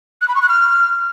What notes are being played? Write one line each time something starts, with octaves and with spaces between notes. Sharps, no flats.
F#6
B5
C#6
F#6
F6